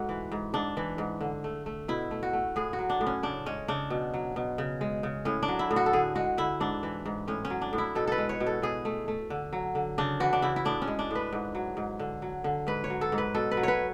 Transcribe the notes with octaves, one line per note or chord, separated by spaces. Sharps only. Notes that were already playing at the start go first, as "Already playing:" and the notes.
Already playing: G#2 A3 F#4
E3
G#2
G#2 D4
E3
G#2
D3
A3
A3
B2 E4
A3
F#4
A3
A2 G#4
F#4
F#3
D4
A2
C#4
C#3 D4
G#3 C#4
C#3 D4
B2
F#3
B2
C#3
G#3
C#3
A2 C#4
D4
F#3
E4
A2
F#4
A4
D3 G#4
G#3 F#4
D3 E4
G#2 D4
E3
G#2
A2 C#4
C#4
F#3
D4
A2
E4
B2 A4
A4 B4
G#3
C#5
B2
A4
B2 G#4
A3
A3
D3
F#3
D3
C#3 D4
E3 F#4
D4
C#3 E4
E4
A2 D4
C#4
G#3
D4
A2 B4
G#2
F#3
G#2
D3
F#3
D3
G#2 B4
C#5
F#3
A4
G#2
B4
B2 A4
B4
F#3
B4 C#5